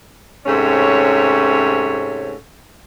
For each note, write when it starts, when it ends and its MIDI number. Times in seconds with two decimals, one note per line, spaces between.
0.46 2.34 44
0.46 2.34 48
0.46 2.34 57
0.46 2.34 61
0.46 2.34 73